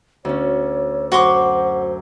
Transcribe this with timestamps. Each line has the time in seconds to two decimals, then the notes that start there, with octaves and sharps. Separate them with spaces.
0.25 D2 C#4 C#5
1.12 F#2 F#4 C5 C6 D6